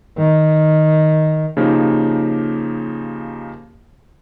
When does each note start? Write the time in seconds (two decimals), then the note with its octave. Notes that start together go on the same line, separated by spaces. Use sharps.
0.18 D#3
1.57 C#3 F3 A#3 D#4 G4